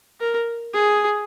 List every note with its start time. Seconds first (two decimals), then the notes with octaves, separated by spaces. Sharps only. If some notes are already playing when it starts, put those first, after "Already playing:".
0.20 A#4
0.73 G#4